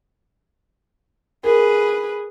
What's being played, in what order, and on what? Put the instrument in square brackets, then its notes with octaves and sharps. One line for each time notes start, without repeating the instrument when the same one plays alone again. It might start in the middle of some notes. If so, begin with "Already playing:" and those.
[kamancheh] G#4 B4 [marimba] A#4